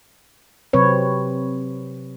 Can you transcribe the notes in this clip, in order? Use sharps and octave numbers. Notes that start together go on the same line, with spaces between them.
C3 F#3 C4 B4 C#5